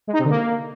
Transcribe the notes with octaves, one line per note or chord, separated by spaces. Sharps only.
G#3
D#4
C3
D3
A#3